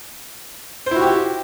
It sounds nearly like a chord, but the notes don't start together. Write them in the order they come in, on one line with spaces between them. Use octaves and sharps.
C5 E4 F#4 G4